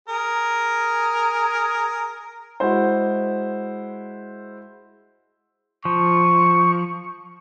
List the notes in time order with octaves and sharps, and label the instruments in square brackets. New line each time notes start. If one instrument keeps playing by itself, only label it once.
[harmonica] G#4 A#4
[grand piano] G#3 E4 F#4 C5
[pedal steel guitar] F3 [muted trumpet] C#6